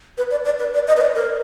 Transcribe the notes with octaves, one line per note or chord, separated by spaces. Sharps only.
B4
D5
D5
B4
D5
D#5
B4
D5
A#4